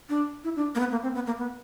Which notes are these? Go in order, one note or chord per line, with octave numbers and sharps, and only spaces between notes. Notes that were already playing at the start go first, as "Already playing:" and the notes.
D4
E4
D4
A#3
B3
A#3
C4
B3
A#3
B3